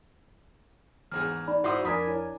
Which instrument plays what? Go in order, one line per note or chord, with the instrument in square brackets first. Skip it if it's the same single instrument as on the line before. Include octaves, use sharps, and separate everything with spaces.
[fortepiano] E2 G#2 G#4 [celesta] F6
[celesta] D#4 D5 B5
[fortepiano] G#2 E4 D#6 [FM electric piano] F#4 C5 C6
[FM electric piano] F2 A#4 G#5 [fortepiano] D4 [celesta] B5 D#6 B6
[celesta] E4 C#5